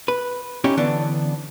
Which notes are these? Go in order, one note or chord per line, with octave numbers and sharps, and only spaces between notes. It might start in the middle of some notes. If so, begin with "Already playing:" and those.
B4
C#4 D#4 E4 G4
D3 E3 B3 D4